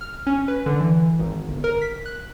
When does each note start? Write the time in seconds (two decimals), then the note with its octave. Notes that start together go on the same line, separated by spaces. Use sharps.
0.01 F6
0.27 C#4
0.48 B4
0.66 D3
0.80 E3
1.19 G#1
1.48 G1
1.64 A#4
1.82 B6
2.06 F#6